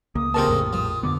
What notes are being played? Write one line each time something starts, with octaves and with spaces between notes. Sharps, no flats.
C#2 A#3 D#6
A#2 C#3 C4 G4 A#4 A5
A#1 F2 A2
F3
F2 D3 B3 D6